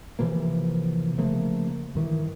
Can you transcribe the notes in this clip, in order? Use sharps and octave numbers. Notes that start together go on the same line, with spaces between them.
C3 E3 F3 A#3
C#3 F3 A3 A#3
G2 D#3 E3